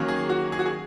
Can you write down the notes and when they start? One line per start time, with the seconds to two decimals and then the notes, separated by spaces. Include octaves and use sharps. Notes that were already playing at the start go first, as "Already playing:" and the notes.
Already playing: D#3 F#3 A#3 C#4
0.08 G#4
0.29 F#4
0.52 G#4
0.59 F#4
0.66 G#4